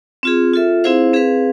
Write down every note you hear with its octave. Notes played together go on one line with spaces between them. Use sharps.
C4 F4 G#4
F4 A4 E5
C4 E4 G#4 C5 F5
C4 G#4 B4 F5